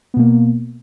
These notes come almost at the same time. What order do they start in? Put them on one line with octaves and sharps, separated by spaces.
B3 B2 A#3